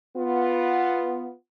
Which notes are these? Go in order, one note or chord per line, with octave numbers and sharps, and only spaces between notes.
B3 F4